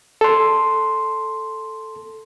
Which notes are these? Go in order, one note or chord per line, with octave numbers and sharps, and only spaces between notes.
A4 C6